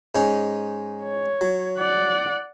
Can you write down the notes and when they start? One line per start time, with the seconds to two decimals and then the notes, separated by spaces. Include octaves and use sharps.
0.15 G#2 C#4 D#4
1.03 C#5
1.41 F#3
1.78 D5 F#5